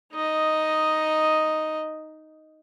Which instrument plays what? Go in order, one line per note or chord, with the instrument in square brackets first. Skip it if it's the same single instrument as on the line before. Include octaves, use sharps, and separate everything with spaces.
[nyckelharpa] D#4 D#5